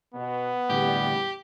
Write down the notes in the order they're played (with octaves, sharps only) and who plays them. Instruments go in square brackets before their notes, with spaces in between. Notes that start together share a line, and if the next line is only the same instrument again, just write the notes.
[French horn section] B2 [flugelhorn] B3
[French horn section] E2 G3 [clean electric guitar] A2 D3 [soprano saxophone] G4